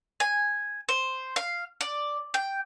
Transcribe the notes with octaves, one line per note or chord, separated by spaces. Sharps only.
G#5
C5
F5
D5
G5